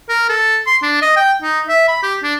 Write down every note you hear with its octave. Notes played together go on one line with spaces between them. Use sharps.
A#4
A4
C6
D4
D#5
G5
D#4
E5
B5
G4
D4